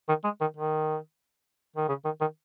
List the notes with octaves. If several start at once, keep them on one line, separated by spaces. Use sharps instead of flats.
D#3
G#3
D#3
D#3
D#3
C#3
D#3
D#3